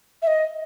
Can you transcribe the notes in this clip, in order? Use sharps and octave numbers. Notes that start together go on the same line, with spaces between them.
E5
D#5